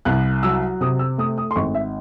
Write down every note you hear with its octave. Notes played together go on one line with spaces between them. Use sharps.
C2 F#6
F#3 E6
C3 D#6
E6
A3 D#6
D#6
C6
G#1 C#6
E5